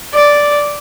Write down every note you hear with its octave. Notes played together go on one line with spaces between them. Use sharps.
D5